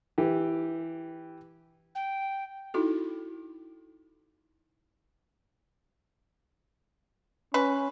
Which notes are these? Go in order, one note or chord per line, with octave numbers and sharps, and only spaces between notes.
E3 G4
G5
D#4 E4 F#4 A4
C#4 B4